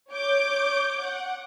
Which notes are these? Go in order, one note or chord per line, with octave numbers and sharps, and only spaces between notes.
C#5 D6 G6
F#5